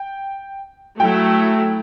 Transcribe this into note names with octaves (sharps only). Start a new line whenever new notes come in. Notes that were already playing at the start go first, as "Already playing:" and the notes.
Already playing: G5
F#3 A3 E4 G5